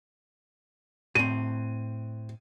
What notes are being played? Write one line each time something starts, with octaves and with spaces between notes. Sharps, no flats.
A2 C4 D#7